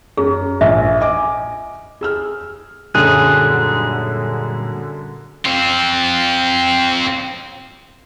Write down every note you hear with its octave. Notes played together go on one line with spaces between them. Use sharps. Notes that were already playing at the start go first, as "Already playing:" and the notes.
F#2 G#4
A#1 D#5 E5
D#5 G#5 D6
G#4 E6 F6
F#2 A#2 D3 F#3 G3 G#4 F#6
C4 F4